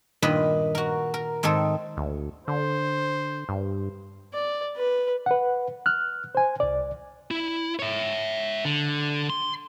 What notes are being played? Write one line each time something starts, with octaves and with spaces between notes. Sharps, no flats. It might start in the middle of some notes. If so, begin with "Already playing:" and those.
G2 A#2 D#3 B4 D#5 B5
F#4 A#4
A#4
G#2 D#3 C4 D#4 A4
D2
D3 C5
G2
D5
B4
B4 F#5
F6 F#6
C5 G#5
C2 D5
E4
C#5 E5
D3
C6